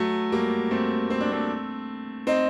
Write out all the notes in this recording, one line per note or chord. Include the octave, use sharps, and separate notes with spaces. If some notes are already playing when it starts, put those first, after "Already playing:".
Already playing: F#3 A3
G3 A#3
A3 C4
C4
D4
A3 C4
C4 D#4